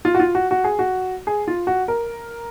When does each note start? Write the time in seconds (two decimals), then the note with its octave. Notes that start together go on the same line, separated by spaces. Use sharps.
0.05 F4
0.15 F#4
0.20 F4
0.35 F#4
0.51 F#4
0.64 G#4
0.79 F#4
1.27 G#4
1.48 F4
1.67 F#4
1.88 A#4